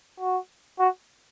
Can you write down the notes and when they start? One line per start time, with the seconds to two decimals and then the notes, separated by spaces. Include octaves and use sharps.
0.20 F#4
0.80 F#4